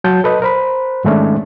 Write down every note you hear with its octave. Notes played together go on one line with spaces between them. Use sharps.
F#3 A5 G6
A4 B4 D#5
A#4 C5 B5
G#2 D#3 G#3 A3 C#4 D4